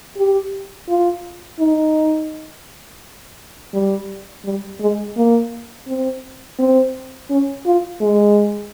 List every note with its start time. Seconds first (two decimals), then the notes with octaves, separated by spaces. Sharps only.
0.17 G4
0.89 F4
1.59 D#4
3.74 G3
4.45 G3
4.80 G#3
5.17 A#3
5.88 C4
6.59 C4
7.30 C#4
7.66 F4
8.01 G#3